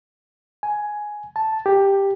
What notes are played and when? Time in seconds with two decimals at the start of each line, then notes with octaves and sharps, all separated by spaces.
0.63 G#5
1.36 A5
1.66 G4